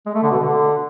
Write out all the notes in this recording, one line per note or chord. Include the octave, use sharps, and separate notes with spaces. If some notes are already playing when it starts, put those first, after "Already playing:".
G#3
A3
D3
B2
D3